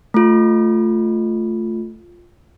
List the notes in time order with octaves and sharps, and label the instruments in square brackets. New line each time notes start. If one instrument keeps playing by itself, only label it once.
[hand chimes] A3 F4